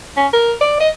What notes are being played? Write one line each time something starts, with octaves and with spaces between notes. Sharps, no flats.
C#4
A#4
D5
D#5